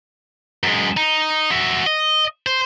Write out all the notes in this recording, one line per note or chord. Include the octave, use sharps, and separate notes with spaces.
F#2 G#3
D#4
F#4 E5
D#5
C5